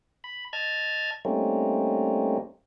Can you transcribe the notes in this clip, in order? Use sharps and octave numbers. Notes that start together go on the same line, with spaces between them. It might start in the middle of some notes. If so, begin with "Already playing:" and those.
B5
D#5 A5 F6 G#6
G3 A3 A#3 C4 C#4 D#4